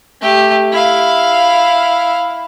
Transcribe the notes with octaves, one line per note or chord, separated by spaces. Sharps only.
A3 G4
E4 F5